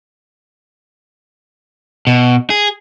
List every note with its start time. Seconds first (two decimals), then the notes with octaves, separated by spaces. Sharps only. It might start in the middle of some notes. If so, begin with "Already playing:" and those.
2.07 B2
2.50 G#4